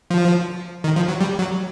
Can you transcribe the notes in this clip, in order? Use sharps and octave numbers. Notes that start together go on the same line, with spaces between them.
F3
D#3
F3
F#3
G3
F#3